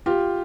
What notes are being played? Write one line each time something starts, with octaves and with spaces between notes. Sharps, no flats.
F4 G4